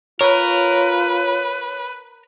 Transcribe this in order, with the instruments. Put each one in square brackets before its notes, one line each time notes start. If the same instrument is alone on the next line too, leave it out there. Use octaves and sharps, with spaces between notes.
[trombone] F4 [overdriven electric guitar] A#4 [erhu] B4 [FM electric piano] C#5